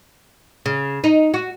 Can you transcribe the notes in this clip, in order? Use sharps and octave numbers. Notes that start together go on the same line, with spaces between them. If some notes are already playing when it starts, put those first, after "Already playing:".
C#3
D#4
F#4